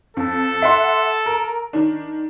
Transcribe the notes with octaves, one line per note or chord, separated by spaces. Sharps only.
F2 A4
E5 F#5 C6
A#4
D#3 D4